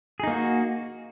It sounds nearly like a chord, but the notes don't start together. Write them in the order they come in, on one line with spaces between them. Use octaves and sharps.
G#4 D#4 A#3 F#4